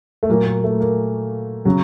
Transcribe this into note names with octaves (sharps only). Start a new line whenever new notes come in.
A3
A#2 F#3 A#3
A#3
A3
A#3
C#3 F#3